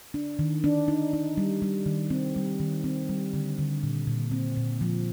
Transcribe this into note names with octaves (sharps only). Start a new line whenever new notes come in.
D4
D#3
D4
D#4
D#4
G3
G3
D#3
C4
G3
D#3
C4
G3
D3
D3
A#2
A#2
C4
A#2
F3